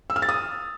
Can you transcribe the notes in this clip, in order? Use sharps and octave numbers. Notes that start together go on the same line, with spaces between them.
E6
F6
A6
D#6